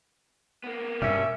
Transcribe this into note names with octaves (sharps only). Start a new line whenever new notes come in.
A#3 B3
G2 B2 G3 C#4 E5